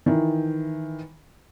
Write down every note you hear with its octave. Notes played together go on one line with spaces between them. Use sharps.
D#3 E3